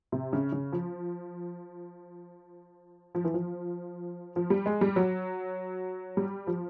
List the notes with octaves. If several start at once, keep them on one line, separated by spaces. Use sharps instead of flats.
C3
C#3
C#3
F3
F3
E3
F3
F3
G3
G#3
G3
F#3
G3
F3